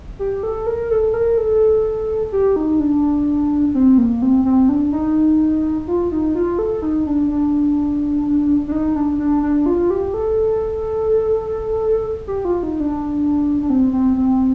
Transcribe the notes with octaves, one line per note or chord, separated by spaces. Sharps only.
G4
A4
A#4
A4
A#4
A4
G4
D#4
D4
C4
A#3
C4
C4
D4
D#4
F4
D#4
F4
A4
D#4
D4
D4
D4
D#4
D4
D4
D4
F4
G4
A4
G4
F4
D#4
D4
D4
C4
C4
C4